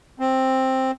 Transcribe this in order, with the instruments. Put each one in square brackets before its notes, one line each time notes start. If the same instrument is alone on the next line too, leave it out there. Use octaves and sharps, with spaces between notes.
[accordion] C4